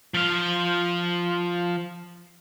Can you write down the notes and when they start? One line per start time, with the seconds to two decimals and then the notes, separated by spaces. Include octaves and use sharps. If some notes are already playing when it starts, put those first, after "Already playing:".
0.14 F3 F5